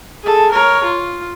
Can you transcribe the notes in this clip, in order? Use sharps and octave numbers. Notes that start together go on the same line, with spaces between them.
G#4 A4
A#4 C#5
F4